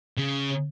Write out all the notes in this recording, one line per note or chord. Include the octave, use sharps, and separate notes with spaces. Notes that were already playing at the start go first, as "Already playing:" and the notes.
C#3